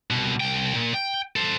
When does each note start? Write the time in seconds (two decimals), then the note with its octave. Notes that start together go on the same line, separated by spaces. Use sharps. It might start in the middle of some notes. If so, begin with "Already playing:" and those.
0.11 C2 B2
0.40 C2 G5
0.75 A#2
0.94 G5
1.36 A4 C5